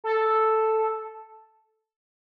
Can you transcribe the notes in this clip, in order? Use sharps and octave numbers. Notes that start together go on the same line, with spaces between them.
A4